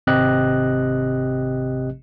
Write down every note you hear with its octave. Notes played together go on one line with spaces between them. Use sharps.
G#1 C3 C4 G4 D#5 F#6